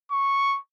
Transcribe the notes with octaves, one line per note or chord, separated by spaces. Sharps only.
C#6